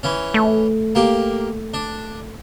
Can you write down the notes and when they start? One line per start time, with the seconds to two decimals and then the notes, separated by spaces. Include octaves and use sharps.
0.03 E3 C#4
0.34 A3
0.95 A#3 G4
1.74 D4